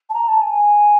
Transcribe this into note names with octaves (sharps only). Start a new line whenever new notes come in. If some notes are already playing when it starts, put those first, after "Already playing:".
A5
A#5
A5
G#5